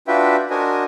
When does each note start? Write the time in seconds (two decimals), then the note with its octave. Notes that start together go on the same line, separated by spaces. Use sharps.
0.08 D4 F4 F#4 B4 E5 G5
0.50 D4 F#4 A#4 C5 D#5 G#5